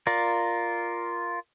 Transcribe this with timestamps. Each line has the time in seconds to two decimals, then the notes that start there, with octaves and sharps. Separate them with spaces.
0.07 F4 A#4 D5